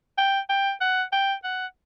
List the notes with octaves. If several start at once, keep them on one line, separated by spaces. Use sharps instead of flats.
G5
G5
F#5
G5
F#5